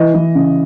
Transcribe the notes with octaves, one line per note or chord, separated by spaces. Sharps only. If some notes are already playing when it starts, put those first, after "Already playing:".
Already playing: E3 D#5
E3
C#3